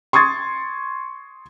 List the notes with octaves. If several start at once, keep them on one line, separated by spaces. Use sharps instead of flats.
C6 C#6 D#6 G#6 A6